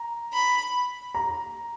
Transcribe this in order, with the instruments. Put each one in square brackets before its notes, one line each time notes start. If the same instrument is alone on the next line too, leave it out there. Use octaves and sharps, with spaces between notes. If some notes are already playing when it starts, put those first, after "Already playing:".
Already playing: [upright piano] A#5
[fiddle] B5
[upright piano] A#5